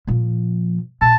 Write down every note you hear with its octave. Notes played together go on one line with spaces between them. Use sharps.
A#2 F3
A#2 A5